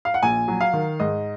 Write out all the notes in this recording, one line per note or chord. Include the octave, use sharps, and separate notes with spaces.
F5
F#5
A#1 G#5
F#3
F5
D#3
G#2 D#5